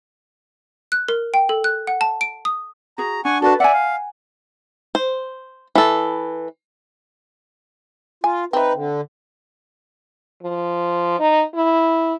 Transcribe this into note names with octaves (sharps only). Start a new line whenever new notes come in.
F#6
A#4
G5
A4
F#6
F#5
A5
D7
D#6
F#4 G#4 A#5
D4 F#5 G#5 C#6
D4 F#4 A4 B4 A5
D5 E5 F#5 G#5
F5
C5
E3 A4
F4 G#5
C4 D#4 B4 E5
D3
F3
D#4
E4